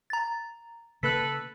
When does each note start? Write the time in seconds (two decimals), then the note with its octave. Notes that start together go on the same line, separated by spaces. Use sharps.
0.10 A#5 A6
1.03 C#3 A#3 A4 B4 F#6 B6